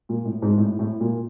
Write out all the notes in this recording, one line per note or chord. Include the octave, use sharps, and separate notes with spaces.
A#2
A2
G#2
A2
A2
A#2